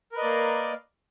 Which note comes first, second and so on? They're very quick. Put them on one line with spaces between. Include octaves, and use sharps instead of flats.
A#4 B4 D#5 D5 A#3